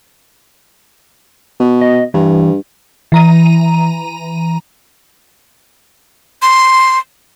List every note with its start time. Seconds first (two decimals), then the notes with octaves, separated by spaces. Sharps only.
1.60 B2
1.81 D#5
2.14 G2 E3
3.12 E3 A#5 D#7
6.42 C6